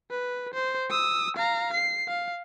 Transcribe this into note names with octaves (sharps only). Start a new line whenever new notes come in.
B4
C5
D#6 E6
F5 A#5
C7
F5